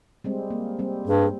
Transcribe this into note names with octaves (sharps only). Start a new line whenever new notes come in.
G3 G#3 C4
A#3
G3 C4
G2 G#4